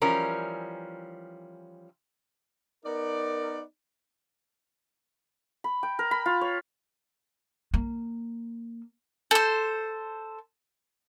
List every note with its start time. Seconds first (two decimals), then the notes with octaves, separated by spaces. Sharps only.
0.02 E3 F3 G3 C#4 A#4
2.85 B3 D#4 A#4 D5
5.64 B5
5.83 G5
5.99 A#4
6.11 B5
6.26 F4
6.41 C#5
7.74 A#3
9.31 A4 C5